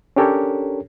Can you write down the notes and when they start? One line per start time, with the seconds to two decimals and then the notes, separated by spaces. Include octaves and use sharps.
0.16 C#4 D4 G4 A4 A#4 C#5